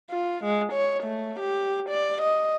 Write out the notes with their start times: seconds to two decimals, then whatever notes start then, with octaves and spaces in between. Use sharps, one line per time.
0.11 F4
0.44 G#3
0.73 C#5
1.04 A3
1.40 G4
1.89 D5
2.21 D#5